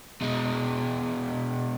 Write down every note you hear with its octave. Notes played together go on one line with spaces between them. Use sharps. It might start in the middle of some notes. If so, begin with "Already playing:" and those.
B2 G#3